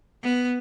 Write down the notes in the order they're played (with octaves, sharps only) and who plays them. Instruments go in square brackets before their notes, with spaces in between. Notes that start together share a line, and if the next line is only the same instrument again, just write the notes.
[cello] B3